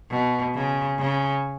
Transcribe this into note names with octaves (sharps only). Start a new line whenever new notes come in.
B2
C#3
C#3